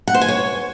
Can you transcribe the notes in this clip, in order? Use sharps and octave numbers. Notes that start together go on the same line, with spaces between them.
F#5
C5
G#5
C#5